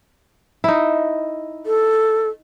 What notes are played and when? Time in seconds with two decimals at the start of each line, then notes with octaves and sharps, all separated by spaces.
0.64 D#4 E4
1.66 A4